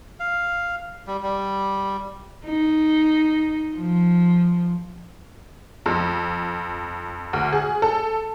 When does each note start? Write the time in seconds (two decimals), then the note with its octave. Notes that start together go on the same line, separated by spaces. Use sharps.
0.20 F5
1.07 G3
1.23 G3
2.46 D#4
3.77 F3
5.86 F2
7.33 D2
7.53 G#4
7.82 A4